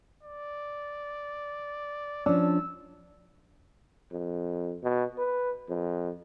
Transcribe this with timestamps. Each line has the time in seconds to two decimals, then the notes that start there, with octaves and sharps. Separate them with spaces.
0.23 D5
2.26 F3 C#4 D4 E6
4.12 F2
4.83 B2
5.18 B4
5.70 F2